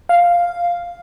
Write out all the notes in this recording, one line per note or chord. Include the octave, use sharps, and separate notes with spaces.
F5